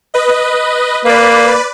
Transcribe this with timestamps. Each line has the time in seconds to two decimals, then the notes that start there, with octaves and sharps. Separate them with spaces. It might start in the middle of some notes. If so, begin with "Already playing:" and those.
0.14 B4 D#5
1.05 A#3 B4 D5